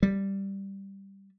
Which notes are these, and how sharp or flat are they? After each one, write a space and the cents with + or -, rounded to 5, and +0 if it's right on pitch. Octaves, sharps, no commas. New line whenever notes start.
G3 +0